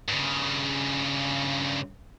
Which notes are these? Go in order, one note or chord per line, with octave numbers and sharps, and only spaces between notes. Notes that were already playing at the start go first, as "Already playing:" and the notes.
G2 C#3